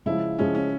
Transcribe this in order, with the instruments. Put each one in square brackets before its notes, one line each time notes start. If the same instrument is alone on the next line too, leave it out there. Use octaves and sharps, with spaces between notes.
[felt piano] C#3 F3 G#3 [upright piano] E4
[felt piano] C#3 F3 G#3 [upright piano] C#4
[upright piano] C#4